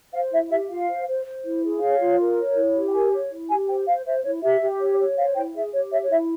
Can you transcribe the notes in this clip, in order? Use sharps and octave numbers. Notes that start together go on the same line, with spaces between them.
C5 F5
E4 E5
G4 E5
F4 F5
C5
C5
C5
E4
G#4
C#5 F5
F4
A#4
C#5
E4
G4
G5
A#4 G#5
C#5
E4
G4 G#5
C5 G5
C5 F5
C5 E5
E4 C#5
G4 E5
G4
C#5
C#5
C5 F5
E4 G5
G#4 E5
G4 C#5
C#5 E5
C#5
E4 E5